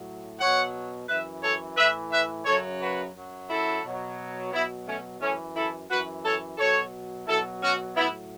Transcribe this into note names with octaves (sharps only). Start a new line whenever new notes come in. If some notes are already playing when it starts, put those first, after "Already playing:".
Already playing: A2 F#3
B2 F#3 C#5 F#5
F#2 E3 B4 E5
A4 C#5
A2 E3 B4 E5
B4 E5
F#2 C#3 F#3 A4 C#5
F#4 B4
F#2 F#3
E4 A4
B2 F#3
B2 F#3 B3 E4
A3 C#4
F#2 E3 A3 C#4
E4 A4
F#2 E3 F#4 B4
A4 C#5
B2 F#3 A4 C#5
B2 F#3 E4 A4
C#4 F#4
A2 F#3 B3 E4